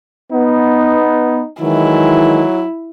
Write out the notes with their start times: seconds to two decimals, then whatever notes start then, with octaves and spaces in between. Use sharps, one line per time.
0.32 B3 D#4
1.62 D#3 E3 F#3 G#3 E4